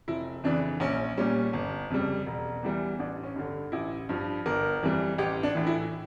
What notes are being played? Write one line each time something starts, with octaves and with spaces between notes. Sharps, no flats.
F1 E4
F2 C#3 E3 D4
A#1 C#4
A#2 G3 C#4
G1
F2 C#3 G3
E1
E2 E3 G3
A1 D4
C#4
G2 D3
A1 E4
G2 F3
G1 A#4
F2 E3 G3
A1 G4
D4
A2 E3
E4